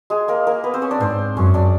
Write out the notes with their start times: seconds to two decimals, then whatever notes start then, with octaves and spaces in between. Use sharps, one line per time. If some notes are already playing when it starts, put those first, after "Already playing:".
0.10 G#3 G#4
0.28 A#3 A#4
0.47 A#3 A#4
0.64 B3 B4
0.74 C4 C5
0.82 C#4 C#5
0.91 D4 D5
1.00 G#2 C4 C5
1.36 F#2 C#4 C#5
1.54 D4 D5